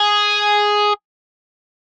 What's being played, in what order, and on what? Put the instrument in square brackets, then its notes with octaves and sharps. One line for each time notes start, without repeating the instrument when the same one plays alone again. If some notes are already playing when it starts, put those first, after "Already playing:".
Already playing: [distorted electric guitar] G#4